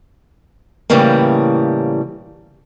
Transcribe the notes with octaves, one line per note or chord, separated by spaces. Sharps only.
A2 C#3 E3 G3 A3 A#3